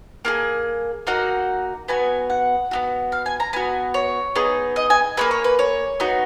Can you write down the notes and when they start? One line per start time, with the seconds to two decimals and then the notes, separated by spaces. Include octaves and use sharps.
0.25 A#3 F4 G#4
1.07 A#3 D#4 F#4 F#5
1.88 B3 F#4 G#5
2.30 F#5
2.71 B3 D#4 F#4
3.12 F5
3.26 G#5
3.40 A#5
3.53 B3 F#4 G#5
3.94 C#5
4.35 B3 D#4 G#4
4.76 D#5
4.90 G#5
5.17 A#3 C#4 G#4 B4
5.31 C#5
5.44 B4
5.59 C#5
6.00 B3 D#4 F#4